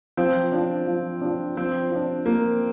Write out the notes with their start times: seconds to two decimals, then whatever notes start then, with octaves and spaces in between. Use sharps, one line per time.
0.17 F3 C4
0.52 D4 F4
0.87 F3
1.22 D4 F4
1.57 F3 C4
1.91 D4 F4
2.26 F3 A#3